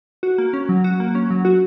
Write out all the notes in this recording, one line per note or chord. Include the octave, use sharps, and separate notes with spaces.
F#4
A#3
C#4
F#3
F#4
A#3
C#4
F#3
F#4